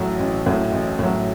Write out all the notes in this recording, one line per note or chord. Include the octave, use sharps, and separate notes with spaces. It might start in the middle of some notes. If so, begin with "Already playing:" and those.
Already playing: A1 A2 F#3
A1
A2 F#3
A1
A2 F#3